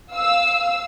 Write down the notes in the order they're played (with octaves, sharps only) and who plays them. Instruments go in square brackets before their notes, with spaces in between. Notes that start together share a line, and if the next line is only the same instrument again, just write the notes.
[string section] F5 E6